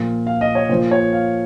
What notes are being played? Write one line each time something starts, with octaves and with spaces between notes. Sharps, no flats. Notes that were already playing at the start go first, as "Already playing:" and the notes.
Already playing: A#2 F3
F5
D#5
C#5
A#2 F3 C5
C#5
F5